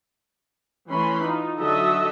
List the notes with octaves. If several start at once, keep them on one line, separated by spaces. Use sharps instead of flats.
E3 A3 C#4 B5 C6
D#4 F4
D3 F#3 F#4 A4 D#5 E5